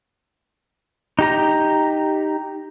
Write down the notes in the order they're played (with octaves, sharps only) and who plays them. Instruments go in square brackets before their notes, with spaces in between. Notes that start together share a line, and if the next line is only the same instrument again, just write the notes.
[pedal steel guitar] D#4 G4 A#5